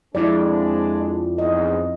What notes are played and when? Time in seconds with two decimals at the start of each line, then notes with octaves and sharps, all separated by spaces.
0.15 F2 G#3 D4 E4 D5
1.38 E2 G#2 D#5